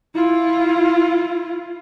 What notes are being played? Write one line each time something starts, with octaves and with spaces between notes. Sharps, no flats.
E4 F4